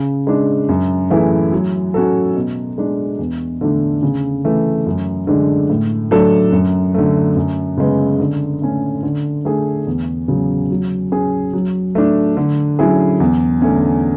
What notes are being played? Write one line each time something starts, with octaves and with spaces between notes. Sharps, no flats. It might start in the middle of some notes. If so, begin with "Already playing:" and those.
Already playing: C#3
G#3 D4
F#2
E3 A3 E4 G#4
F#3
C#4 F#4 A4
B2
G#3 D4
E2
D3 A3 D4
C#3
E3 A3
F#2
D3 G#3 D4
A2
F#3 A3 D4 A4
F#2
D3 A3
F#2
C#3 G#3 B3
D3
A3 C#4
D3
A3 D4 G#4
E2
C#3 F#3
F#3
C#4 G#4
F#3
A3 D4
D3
F#3 C#4 E4 G#4
E2
D3 A3 C#4